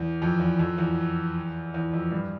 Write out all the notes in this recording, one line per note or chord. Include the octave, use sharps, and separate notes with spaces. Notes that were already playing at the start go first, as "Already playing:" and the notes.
Already playing: E2
F2
E2
F2
E2
E2
F2
G2